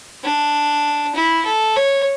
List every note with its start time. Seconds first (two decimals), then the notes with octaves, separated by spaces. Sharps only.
0.23 D4
1.15 E4
1.45 A4
1.76 C#5